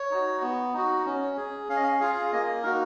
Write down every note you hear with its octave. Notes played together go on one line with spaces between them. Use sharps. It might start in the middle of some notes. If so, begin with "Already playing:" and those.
Already playing: C#5
D#4 F#4
B3
D#4 F#4
C#4
G#4
C#4 F5
D#5
F5
F4 G#4 F5
A#3 D#5
D#4 F#4 A#4